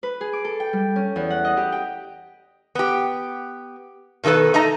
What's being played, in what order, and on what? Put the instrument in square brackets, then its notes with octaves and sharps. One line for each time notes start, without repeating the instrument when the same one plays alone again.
[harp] B4
G#4
D6
A4
G5
G3
C#4
E2
F#5
D#5
G4
G5
[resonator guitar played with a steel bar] B3 G4
B2 D#3 A3 A4 B4
A3 D#4 D#5 A#5